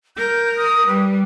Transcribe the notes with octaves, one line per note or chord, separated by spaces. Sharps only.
A#4 G6
D#6
G3 B4